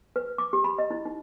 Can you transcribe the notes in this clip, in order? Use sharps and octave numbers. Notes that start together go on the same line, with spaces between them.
B4
D6
G4
B5
D#5
E4
D#4